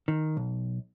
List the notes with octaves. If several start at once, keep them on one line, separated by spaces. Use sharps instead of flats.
D#3
B1